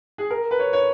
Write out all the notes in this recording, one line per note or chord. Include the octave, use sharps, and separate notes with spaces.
G#4
A#4
B4
C#5
C#5